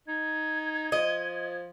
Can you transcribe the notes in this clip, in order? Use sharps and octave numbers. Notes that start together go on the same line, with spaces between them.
D#4 G#6
F3 D#5